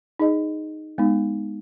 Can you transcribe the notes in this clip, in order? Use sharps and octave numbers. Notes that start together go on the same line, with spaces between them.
D#4 G#4 D#5
G#3 B3 D#4